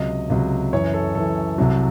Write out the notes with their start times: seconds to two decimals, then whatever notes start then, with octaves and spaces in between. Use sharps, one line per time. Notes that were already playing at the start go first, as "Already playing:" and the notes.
Already playing: C#2 C3 F#3 D#5
0.30 C#2 C3 F#3
0.73 F#2 E3 C#5
0.94 A4
1.15 F#2 E3 A4
1.58 C2 C3 F#3